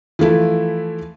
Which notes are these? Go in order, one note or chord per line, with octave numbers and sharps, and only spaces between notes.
E3 F3 A3 E4